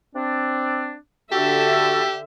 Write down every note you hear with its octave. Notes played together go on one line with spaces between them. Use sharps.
C4 D4
D3 F#4 G4 A4 E5